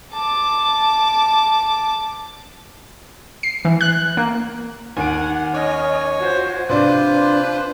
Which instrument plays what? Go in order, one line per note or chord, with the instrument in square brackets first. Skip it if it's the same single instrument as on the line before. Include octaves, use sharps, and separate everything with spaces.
[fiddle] A5 D6
[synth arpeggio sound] C7
E3
F#6
A#3
[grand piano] D#2 D#3 D7 [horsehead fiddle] F#5 [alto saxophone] G#5
[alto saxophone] C#4 [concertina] C#5 G#5 [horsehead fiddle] D#5
[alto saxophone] F3 [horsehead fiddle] F#4 C5
[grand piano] C3 D5 [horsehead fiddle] D4 [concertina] F4 C5 [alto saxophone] B4